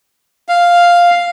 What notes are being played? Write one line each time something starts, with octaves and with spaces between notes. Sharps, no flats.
F5